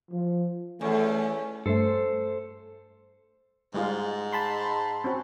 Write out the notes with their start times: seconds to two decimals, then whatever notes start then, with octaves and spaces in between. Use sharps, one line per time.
0.12 F3
0.81 E2 A3 C#4
1.66 G2 A3 A4 C5
3.74 G#2 G3 G#3 F4
4.33 A5 B5 C6
5.04 C4 C#4 F#4